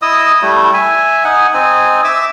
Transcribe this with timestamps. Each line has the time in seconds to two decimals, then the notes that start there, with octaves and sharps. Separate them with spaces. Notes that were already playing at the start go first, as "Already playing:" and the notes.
0.02 E4 D#5 D#6 E6
0.42 G3 A3 E4
0.74 E5 G#5
1.24 D#4 F#5 G#5
1.54 C4 D#4 G#5
2.04 E5 D6 E6